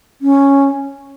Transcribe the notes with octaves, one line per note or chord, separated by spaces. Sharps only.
C#4